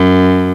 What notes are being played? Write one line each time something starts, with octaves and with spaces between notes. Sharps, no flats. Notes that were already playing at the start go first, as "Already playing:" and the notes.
Already playing: F#2